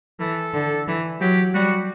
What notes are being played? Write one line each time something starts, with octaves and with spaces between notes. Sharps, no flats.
E3 A4
D3
E3
F#3 G4
G3 F#4